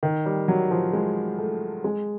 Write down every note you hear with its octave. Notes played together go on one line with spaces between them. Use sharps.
D#3
G3
F#3
F3
G#3
A3
G#3